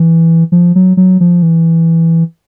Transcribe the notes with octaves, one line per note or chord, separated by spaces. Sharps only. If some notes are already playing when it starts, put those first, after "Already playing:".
Already playing: E3
F3
F#3
F#3
F3
E3